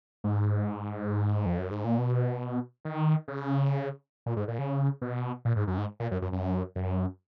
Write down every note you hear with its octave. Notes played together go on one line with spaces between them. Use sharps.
G#2
F2
F#2
G#2
A#2
B2
D#3
C#3
A#2
G#2
A#2
C#3
B2
A#2
G#2
F#2
G#2
A#2
F#2
F#2
F#2
F#2